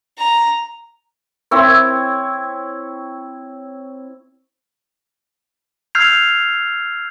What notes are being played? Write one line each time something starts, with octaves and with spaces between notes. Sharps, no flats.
A#5
C4 E4 C#5
E6 F6 G6 G#6 C7 F7